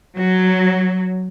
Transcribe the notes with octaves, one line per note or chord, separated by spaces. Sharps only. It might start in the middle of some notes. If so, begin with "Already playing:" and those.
F#3